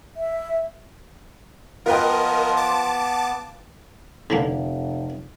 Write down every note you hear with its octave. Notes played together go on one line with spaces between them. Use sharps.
E5
F3 B3 F4 A#4 B4 D#5 G5
A5 D6
F1 D3 E3 A#3